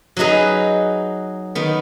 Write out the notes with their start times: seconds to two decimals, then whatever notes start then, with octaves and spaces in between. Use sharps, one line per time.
0.17 F#3 D#4 G#4 B4 D#5
1.55 D#3 B3